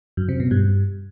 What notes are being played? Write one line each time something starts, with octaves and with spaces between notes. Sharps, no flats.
F#2
C3
B2
G2